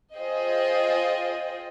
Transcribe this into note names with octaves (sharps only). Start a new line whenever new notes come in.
F4 G#4 C5 D#5 G5